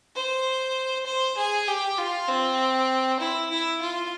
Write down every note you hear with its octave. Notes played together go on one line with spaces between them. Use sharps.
C5
C5
G#4
G4
F4
C4
E4
E4
F4